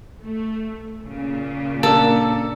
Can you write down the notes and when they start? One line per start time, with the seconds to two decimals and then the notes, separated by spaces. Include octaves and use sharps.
0.23 A3
1.08 A#2 C#3
1.83 A#3 D4 A4